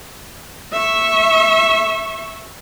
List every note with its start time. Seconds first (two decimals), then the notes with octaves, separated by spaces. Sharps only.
0.72 E5 C#6